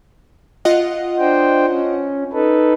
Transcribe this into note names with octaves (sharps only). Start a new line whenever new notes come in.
F4 D#5 F#5
D4 C5 G5
C#4
D#4 A4 B4